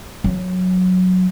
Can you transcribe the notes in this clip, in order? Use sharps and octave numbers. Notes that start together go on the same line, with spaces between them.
F#3